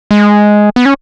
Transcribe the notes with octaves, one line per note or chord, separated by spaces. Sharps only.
G#3
B3
C#4